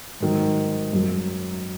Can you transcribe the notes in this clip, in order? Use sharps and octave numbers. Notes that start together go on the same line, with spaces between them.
G#2 D#3 F#3
F#2 F#3